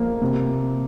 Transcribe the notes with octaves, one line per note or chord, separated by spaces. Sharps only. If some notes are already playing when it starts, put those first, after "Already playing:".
Already playing: F3 A#3
C3